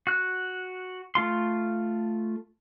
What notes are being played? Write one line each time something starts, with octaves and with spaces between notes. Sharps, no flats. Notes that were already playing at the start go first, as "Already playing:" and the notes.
F#4 F#6
A3 F4 C6